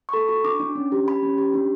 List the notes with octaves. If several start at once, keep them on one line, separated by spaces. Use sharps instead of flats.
C#6
A4 B5
F#4 C#6
D4 D6
D4
C#4
G4
G4 B5
C#4
G4
D4